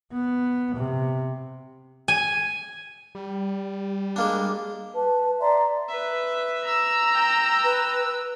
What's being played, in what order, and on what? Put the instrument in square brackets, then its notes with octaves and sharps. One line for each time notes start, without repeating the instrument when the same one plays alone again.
[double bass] B3
C3
[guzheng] G#5
[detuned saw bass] G3
[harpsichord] G#3 A#3 D4
[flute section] B4 A5
D5 E5 A#5 C6
[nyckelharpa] B4 E5
[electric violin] A#5 [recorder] E6
[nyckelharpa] G5
[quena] B4